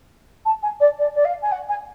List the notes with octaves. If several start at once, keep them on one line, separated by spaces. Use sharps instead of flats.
A5
G#5
D5
D5
D5
F5
G#5
F#5
G#5